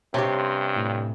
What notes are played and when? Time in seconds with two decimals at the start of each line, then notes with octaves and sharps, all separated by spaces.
0.14 G2 C3 C#4 G4 C6
0.76 A2